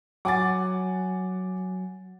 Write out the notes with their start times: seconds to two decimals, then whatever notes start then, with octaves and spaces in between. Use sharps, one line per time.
0.25 F#3 F#5 G#5 D6 A6